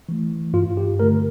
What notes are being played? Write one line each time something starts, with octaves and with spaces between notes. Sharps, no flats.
E3 A3
G2 F4
G4
D3 A3 A#4